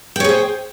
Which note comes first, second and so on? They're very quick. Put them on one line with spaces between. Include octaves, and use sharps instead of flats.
G5 C#5 G#4 C5